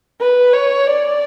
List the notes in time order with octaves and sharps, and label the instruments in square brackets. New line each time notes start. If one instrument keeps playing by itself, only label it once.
[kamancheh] B4
C#5
D5